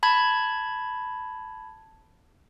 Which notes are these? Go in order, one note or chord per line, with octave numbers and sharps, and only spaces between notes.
A5 B5 G#6